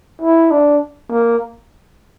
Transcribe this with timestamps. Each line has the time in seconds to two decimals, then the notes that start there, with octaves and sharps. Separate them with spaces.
0.21 E4
0.51 D4
1.10 A#3